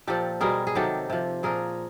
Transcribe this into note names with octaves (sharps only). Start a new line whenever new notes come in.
A#2 F3 G4 A4
B2 G3 G#4 A#4
G#4
C3 D#3 F#3 G4 A4
C3 F3
A#2 F3 G#4 A#4